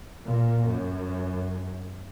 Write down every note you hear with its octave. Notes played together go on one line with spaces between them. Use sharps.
A#2
F#2